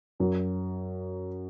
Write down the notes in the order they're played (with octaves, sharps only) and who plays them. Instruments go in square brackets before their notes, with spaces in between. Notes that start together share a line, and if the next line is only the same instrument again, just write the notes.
[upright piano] F#2 F#3